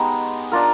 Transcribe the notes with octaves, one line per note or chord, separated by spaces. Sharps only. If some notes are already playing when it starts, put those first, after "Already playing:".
Already playing: G#3 B3 D#4 G4
D4 F4 A#4